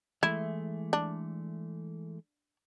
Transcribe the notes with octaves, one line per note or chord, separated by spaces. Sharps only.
E3 G#3 A3 E4
D4